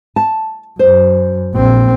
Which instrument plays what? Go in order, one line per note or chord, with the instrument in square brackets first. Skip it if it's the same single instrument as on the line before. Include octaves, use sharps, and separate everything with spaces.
[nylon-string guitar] A5
[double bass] F#2 [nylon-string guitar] C5
[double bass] A#1 C4